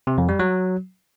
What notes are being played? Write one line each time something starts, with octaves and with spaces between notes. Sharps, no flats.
C3
F2
G3
F#3